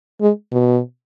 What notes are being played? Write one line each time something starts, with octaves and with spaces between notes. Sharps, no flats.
G#3
B2